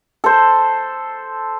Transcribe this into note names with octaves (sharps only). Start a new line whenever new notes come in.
A4 C5